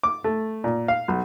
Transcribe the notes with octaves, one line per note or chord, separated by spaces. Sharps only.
D6
A3
A#2
F5
B1